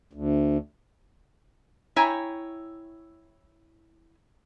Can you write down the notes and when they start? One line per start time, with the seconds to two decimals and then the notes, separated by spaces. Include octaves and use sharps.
0.13 D2
1.96 E4 C#5 G5 G#5 A#5